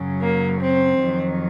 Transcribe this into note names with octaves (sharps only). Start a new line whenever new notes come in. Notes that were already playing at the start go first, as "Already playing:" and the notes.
Already playing: F#2 C#3 F#3
A#3
C4
F2 D#3 F#3